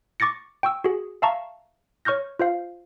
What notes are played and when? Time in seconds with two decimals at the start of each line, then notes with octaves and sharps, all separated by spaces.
0.20 C#6 D6 A6 A#6 C#7
0.63 G5 C#6 E6
0.84 F#4 G#4
1.22 E5 F5 A5 A#5 C#6
2.05 C#5 C#6 F6 G6 A#6
2.39 F4 C5 F5